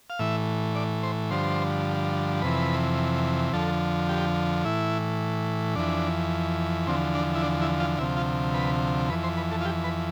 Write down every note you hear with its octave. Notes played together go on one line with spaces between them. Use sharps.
F5
A2 E3 E5
D5
C5
G2 D3 F3 C5
F2 C3 E3 B4
F2 D3 F3 A4
G4
A2 E3 E4
F2 E3 D4
E2 D3 F3 C4
D4
E4
D4
E4
F4
D2 C3 F3 E4
F4
B4
F2 E3 B4
C5
B4
A4
F4
G4
B4